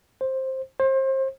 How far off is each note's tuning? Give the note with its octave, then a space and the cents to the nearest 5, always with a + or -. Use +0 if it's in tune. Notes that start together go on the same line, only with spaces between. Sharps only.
C5 +10
C5 +30